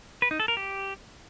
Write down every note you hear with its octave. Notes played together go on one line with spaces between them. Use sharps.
B4
D#4
A4
A#4
G4